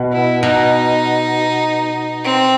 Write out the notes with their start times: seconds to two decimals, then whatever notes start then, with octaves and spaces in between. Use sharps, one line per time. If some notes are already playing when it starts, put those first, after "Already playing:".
Already playing: B2
0.12 E4
0.43 B2 D#4
2.24 C4